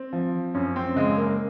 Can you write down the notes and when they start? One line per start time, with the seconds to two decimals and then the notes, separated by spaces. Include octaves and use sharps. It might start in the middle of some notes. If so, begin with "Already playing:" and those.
Already playing: C4
0.13 F3
0.54 F#2 C#4
0.76 C4
0.96 C#3 G#3
1.18 A#3